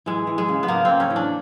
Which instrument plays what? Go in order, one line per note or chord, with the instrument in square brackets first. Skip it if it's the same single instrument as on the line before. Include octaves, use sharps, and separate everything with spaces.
[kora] E3 G#3
E3
G#3
C#3
B3
C#3 A#3
C#3 C4
C#4
E3
D4